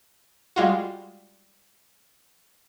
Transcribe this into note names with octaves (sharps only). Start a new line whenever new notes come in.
G3 G#3 F4 F#4